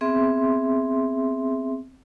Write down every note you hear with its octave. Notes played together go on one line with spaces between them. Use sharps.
B3 C4 G#4 E5 C6